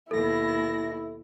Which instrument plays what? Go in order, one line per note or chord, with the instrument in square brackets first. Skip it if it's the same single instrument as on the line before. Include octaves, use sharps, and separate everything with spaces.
[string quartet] D#2 B2 A#6 [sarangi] E4 [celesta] A4